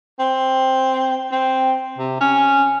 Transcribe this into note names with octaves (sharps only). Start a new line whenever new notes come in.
C4
C4
C3
C#4